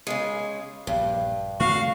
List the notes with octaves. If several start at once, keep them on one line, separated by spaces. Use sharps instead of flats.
C#3 G#3
A#1 G2
C#3 A3 C4 F#4 F5